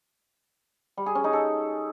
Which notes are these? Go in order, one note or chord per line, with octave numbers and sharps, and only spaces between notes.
G3
G#4
C#4
D#4
A4